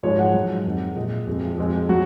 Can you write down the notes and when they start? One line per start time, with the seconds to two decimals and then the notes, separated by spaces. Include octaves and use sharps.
0.03 G#2 F3 G#3 C#5
0.19 F#5
0.34 G#2 F#3
0.66 F2 D#3 G#3
0.96 A#2 G#3 D#5
1.27 F2 F3 G#3
1.58 F2 F3 G#3
1.89 F#3 F#4